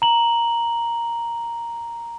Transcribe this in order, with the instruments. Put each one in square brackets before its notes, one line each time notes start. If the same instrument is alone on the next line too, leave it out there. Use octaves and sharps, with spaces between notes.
[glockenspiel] A#5 F#7